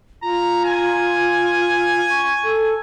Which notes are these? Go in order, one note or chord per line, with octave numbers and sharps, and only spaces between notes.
F4 A#5
G#5
C#6
A4